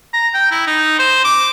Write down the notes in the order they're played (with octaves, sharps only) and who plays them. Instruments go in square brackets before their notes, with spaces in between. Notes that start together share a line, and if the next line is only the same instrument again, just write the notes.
[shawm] A#5
G5
E4
D#4
C5
D6